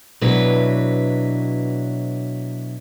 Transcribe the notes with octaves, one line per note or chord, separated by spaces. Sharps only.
B2 F#3 D4 E4 B4